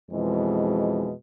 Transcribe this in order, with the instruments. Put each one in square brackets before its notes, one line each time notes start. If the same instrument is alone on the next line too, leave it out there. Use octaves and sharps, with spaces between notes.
[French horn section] F2 B2 E3 G#3